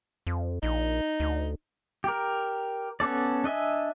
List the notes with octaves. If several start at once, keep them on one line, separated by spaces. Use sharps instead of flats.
F2
A#1 D#4
D2
G4 A#4
B3 C#4 A4 D5
D4 D#5 E5 G#5